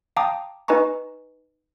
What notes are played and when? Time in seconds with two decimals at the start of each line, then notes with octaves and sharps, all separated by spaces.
0.17 F5 G5 A5 A#5 D6 D#6
0.68 D#4 B4 D#5 G#5 A#5 C#6